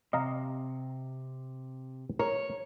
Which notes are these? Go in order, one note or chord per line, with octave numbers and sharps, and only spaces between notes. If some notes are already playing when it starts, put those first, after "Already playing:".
C3 D#5 F5 A#5
A#4 C#5